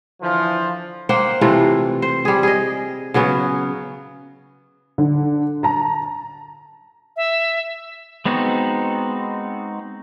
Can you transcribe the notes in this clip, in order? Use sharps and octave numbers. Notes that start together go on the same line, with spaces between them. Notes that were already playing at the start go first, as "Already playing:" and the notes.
D3 E3 F3
A#3 C5 F#5 G5
C3 E3 A3 F4
C5
G3 G#4
G#4 D#5
C#3 F#3 B3 C#4
D3
A5 A#5
E5
G#3 B3 C4 D#4 F#4